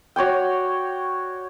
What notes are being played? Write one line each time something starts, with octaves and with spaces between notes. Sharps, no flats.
F#4 C#5 D5 G5